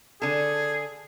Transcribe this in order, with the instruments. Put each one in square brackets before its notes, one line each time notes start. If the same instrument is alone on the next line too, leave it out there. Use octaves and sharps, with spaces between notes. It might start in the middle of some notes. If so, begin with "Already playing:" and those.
[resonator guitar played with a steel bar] D3 A4 [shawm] G#4